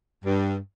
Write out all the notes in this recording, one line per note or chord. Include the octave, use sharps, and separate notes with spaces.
G2